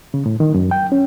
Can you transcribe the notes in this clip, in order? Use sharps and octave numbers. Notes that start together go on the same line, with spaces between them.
C#3
A2
D#3
F#2
G5
C#4